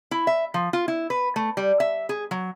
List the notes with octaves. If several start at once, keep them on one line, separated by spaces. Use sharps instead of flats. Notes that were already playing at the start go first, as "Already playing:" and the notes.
E4
E5
F3
F4
E4
B4
A3
G3
E5
G#4
F#3